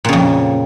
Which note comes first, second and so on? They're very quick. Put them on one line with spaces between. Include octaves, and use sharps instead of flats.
A#2 C#3 F2